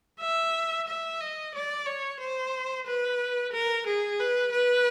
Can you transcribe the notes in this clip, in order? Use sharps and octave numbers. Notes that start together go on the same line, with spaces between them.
E5
E5
D#5
D5
C#5
C5
B4
A#4
G#4
B4
B4